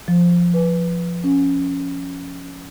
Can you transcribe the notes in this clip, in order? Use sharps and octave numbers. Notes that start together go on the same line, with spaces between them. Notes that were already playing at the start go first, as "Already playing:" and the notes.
F3
B4
C#4